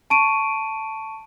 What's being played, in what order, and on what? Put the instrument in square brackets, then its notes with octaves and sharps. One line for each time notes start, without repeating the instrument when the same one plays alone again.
[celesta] A5 C#6 D7 D#7